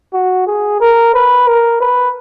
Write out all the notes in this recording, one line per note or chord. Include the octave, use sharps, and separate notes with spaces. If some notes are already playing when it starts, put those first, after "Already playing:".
F#4
G#4
A#4
B4
A#4
B4